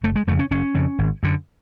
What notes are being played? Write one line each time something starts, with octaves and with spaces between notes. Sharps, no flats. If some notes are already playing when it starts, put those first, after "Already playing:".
F#1 A3
G#3
F2 C#3 A3
C#4
F#1 C#4
F2 C#3
G#1
F#2 D3